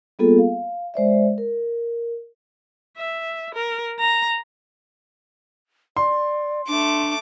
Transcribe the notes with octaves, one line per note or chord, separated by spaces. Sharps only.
G3 A#3 B3 F4 G#4 A4
F5
G#3 C5 D5 E5
A#4
E5
A#4
A#5
D5 C6
A3 D4 D6